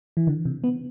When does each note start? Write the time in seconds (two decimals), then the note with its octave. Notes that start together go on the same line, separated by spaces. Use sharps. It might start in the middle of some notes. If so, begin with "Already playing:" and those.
0.17 E3
0.27 D3
0.45 C3
0.64 B3